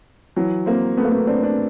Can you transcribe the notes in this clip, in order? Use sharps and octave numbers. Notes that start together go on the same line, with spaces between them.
E3 F#3
A#3 C4
A3 B3
A#3
A3 B3
C4 D4
C4 D4